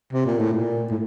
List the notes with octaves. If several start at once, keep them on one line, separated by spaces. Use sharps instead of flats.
C3
A#2
A2
A#2
A2